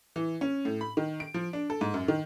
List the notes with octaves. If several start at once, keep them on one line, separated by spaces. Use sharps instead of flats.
E3
C#4
A2
B5
D#3
D7
F3
D4
A4
G#2
F#2
D#3